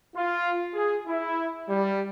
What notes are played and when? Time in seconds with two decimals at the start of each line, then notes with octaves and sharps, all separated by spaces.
0.15 F4
0.74 G#4
1.06 E4
1.68 G3